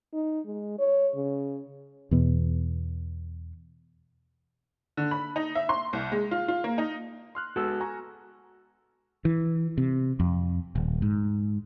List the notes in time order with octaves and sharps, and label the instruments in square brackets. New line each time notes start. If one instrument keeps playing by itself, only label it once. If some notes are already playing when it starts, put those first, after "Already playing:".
[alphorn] D#4
G#3
C#5
C#3
[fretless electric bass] E2 B2
[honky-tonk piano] D3
B5
D#4
E5
C6
C2
G#3
F4
F4
A#3
D#4
[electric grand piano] C6 F6 F#6
[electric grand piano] G#3 B3 E6 [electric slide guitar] F#4 A4
[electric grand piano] G#5 A#5 C#6
[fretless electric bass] E3
C3
F2
D#1
G#2